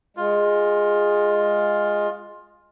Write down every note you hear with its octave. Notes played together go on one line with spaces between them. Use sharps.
G#3 F4